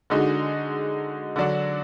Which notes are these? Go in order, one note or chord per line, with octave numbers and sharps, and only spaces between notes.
D3 G#3 D#4 F#4
D3 F#3 D4 F#4